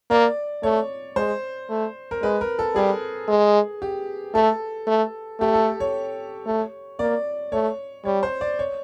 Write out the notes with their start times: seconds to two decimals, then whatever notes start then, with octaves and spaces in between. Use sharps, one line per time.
0.10 A#3 D5
0.63 A3 C#5
1.16 G#3 C5
1.70 A3
2.11 A#4
2.22 G#3 B4
2.41 A#4
2.59 A4
2.75 G3 G#4
3.28 G#3
3.82 G4
4.34 A3 A4
4.87 A3
5.40 A3 G4
5.54 A4
5.80 C#5
6.46 A3
6.99 A#3 D5
7.52 A3 C#5
8.05 G3 C#5
8.23 C5
8.41 D5
8.59 C#5